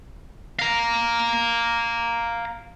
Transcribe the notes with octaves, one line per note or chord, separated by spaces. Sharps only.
F5 A#5